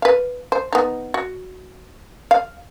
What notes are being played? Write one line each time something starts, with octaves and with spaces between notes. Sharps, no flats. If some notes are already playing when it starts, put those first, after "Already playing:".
B4 F5
C5
B3 D#4
F#4
F5